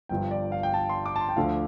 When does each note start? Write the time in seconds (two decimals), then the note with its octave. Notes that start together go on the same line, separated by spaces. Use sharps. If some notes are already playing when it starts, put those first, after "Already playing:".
0.09 G1 G2 F3 G5
0.31 D5
0.52 F5
0.63 G5
0.74 A5
0.89 C6
1.06 D6
1.16 A5
1.21 C6
1.29 G5
1.36 D2 D3 F3 A3 F5